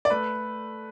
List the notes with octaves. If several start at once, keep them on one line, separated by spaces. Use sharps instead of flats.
D5
A3 B4